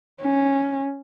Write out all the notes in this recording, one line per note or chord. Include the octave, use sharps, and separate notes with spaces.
C#4